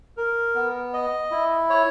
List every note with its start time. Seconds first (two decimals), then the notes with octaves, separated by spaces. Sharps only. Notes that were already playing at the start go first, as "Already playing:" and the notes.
0.17 A#4
0.55 B3
0.94 D#5
1.31 E4
1.70 C#5